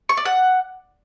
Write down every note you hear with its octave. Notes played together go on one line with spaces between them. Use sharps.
C#6
D5
F#5